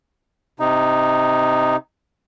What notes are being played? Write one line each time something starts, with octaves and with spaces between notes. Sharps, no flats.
C3 D#4